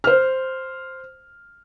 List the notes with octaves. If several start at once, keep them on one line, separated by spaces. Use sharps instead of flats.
C5 F6